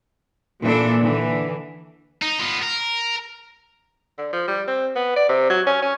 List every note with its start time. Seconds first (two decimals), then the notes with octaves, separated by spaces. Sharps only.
0.61 A#2 E3 D4 A4
1.01 D3 E3
2.22 D#4
2.39 B3 F4
2.62 A#4
4.18 D3
4.33 F3
4.48 G3
4.68 C4
4.96 B3
5.16 D5
5.29 C3
5.50 F#3
5.67 C#4
5.82 C#4